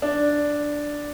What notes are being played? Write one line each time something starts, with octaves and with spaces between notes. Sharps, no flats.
D4